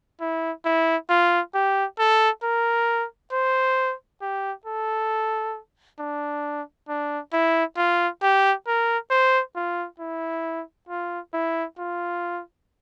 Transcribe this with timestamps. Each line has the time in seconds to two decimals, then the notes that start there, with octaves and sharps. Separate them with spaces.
0.21 E4
0.65 E4
1.10 F4
1.54 G4
1.99 A4
2.43 A#4
3.32 C5
4.21 G4
4.66 A4
5.99 D4
6.88 D4
7.33 E4
7.77 F4
8.22 G4
8.67 A#4
9.11 C5
9.56 F4
10.00 E4
10.89 F4
11.34 E4
11.79 F4